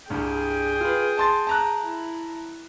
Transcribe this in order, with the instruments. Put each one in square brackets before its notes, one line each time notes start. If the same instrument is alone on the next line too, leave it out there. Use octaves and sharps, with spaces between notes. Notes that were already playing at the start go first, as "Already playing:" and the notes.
[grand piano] C2 G2 [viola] G#4 G5
[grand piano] F4 B4
A5 C6 A6
A5 A#5 F#6
[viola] E4